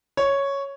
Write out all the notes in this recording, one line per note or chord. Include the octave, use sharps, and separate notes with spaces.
C#5